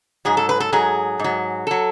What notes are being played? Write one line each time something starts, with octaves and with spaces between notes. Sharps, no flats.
G#2 F#3 G#4
A4
B4
A4
G#2 F#3 G#4
G#2 F#3
F#3 A4